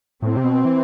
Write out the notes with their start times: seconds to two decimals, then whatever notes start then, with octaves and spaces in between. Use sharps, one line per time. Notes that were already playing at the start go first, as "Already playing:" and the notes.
0.22 A2 C4
0.37 C3
0.44 B2
0.65 E3